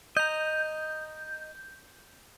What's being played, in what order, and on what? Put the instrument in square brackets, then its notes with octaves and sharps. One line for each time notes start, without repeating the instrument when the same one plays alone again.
[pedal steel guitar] D#5 A#5 [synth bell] G6